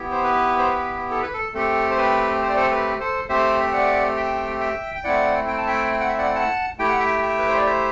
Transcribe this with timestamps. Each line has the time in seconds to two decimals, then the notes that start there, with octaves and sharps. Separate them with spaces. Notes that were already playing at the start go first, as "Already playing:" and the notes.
Already playing: B3 E4 G4
0.11 C5
0.24 B4
0.58 C5
0.67 B4
1.11 A4
1.22 B4
1.33 A4
1.54 A3 C4 G4 A4
1.91 C5
1.98 B4
2.42 C5
2.49 D5
2.56 A4 C5
2.71 B4
3.00 A4 C5
3.29 A3 C4 G4 C5 E5
3.62 E5
3.73 D5 F#5
4.17 E5 G5
4.60 E5 G5
4.95 G5
5.04 A3 C4 E4 D5 F#5
5.47 G5
5.58 A5
5.67 E5 G5
5.92 G5
6.00 F#5
6.09 E5
6.18 D5 F#5
6.35 F#5 A5
6.78 A3 E4 G4 G5
6.89 F#5
6.99 E5 G5
7.23 E5 G5
7.39 B4
7.48 C5
7.57 D5
7.66 C5 E5